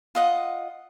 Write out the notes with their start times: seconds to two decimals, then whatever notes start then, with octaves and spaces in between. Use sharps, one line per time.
0.15 F4 D#5 F#5